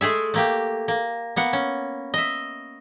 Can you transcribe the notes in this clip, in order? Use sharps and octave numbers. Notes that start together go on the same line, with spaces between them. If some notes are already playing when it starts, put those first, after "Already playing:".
G#3 A3 G#4 E5
A3 A#3 G4
A#3
A#3 B3 F#5
C#4
D#5 E5